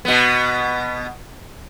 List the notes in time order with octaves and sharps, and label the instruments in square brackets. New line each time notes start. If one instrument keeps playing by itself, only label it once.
[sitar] B2 B3